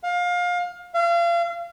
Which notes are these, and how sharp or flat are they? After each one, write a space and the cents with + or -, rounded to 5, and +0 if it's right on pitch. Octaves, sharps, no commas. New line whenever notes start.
F5 +25
F5 -35